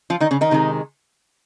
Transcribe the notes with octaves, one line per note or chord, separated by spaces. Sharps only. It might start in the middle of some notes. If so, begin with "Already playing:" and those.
F3 F4
D#3 D#4
C#3 C#4
D#3 D#4
C3 D#3 G#3